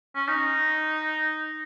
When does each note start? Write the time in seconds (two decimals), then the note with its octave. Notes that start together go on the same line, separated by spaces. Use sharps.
0.15 C#4
0.28 D#4